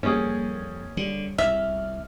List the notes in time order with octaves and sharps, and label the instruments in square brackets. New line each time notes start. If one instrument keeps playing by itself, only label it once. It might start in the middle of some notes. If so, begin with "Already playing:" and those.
[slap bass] F2 [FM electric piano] G3 A#3 [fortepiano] C#4 G#4
[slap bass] D3 [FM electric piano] G3
[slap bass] C2 [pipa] E5 [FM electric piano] F6